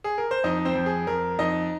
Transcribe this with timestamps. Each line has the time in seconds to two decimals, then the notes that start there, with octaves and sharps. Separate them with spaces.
0.04 G#4
0.18 A#4
0.31 C5
0.44 F2 D#4 D#5
0.65 C4 C5
0.75 F2
0.86 G#4
1.07 F2 A#4
1.39 F2 D#4 D#5